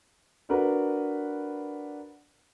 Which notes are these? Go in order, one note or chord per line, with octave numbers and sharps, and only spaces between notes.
D4 F#4 A#4 B4